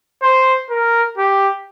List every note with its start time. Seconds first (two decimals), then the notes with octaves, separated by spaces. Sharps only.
0.22 C5
0.70 A#4
1.17 G4